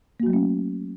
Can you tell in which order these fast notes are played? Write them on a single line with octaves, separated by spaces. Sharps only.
A#3 F#4 F#3 A3 C#4